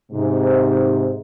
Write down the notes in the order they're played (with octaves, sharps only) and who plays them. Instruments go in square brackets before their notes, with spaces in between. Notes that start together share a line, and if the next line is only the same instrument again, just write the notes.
[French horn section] G#2 C3